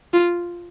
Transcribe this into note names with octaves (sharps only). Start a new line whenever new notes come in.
F4